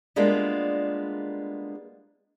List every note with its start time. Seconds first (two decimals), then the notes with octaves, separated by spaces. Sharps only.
0.16 G3 G#3 A#3 B3 D4 F4